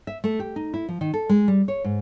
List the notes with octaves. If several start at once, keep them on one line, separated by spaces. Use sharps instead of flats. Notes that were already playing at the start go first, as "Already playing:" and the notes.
E5
A3
G4
D#4
E4
F3
D#3
A4
G#3
G3
C#5
G#2